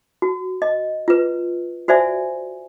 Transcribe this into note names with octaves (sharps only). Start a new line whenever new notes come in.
F#4
D#5
F4 B4
F#4 C5 D5 E5 G#5